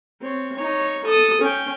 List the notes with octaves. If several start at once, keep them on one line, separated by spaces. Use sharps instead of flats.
C4 C#5
D#4 C#5
A4 D#6
C#4 G5